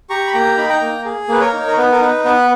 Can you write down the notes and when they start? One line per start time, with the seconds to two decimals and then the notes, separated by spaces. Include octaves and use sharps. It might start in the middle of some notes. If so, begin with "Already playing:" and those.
0.09 G4 A#5 C#6
0.27 B5
0.33 A#3 G5 A#5
0.57 D#4 B5
0.69 G5 A#5
0.81 A#3
1.05 G#4
1.29 A#3 B4
1.41 A#4 C#5
1.53 D#4
1.68 A#4
1.77 B3 B4
1.91 A#4
2.01 D#4 B4
2.25 B3 B4